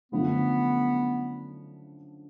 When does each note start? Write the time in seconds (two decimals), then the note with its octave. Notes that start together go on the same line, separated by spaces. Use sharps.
0.11 F#2 D3 F3 A3 B3